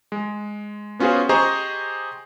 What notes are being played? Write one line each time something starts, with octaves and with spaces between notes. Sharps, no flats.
G#3
B3 C#4 F4 F#4 G#4 C5
G4 G#4 C5 D#5 A#5 C#6